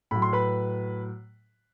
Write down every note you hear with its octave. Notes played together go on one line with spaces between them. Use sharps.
A2 F#3 B5
C6
B4 B5